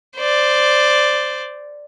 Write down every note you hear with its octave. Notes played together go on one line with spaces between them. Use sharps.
C5 D5